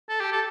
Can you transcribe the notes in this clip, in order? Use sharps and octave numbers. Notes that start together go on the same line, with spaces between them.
A4
G4
A4